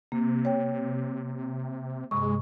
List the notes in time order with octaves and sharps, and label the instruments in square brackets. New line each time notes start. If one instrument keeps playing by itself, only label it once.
[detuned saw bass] C3 [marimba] A#3
[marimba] C#5 G5
[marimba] G2 C3 C#6 [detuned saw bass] G#3